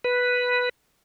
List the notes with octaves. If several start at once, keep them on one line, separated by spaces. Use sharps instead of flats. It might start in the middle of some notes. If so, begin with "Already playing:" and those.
B4